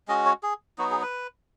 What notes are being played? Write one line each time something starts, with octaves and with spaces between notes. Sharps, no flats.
G#3 C#4 F#4 D#5
C#5
G#4
F#3 B3 D#4 F#4
G#4
B4